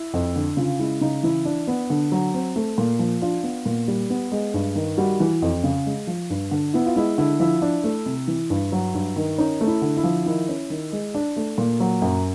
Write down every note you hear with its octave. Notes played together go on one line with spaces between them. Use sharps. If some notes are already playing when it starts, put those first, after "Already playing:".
Already playing: E4
F2
D3
C#3 F4
G#3 E4
C#3 D#4
E3 E4
D4
B3
D3
F#3
C4
A3
A#2
F3
D4 F4
B3
A#2
G3
B3
G#3
G2
D#3
G3 F#4
E3
F2
C#3
G#3
F3
G2
D3
B3 E4
F4
G#3 E4
D3 E4
F3 E4
D4
A3
C3
E3
G2
F#3
G2
D#3
C#4 D#4
A3
E4
D3
E4
F3
D#3 E4
C#4
D#3
G#3
D4
A3
A#2
F#3
F#2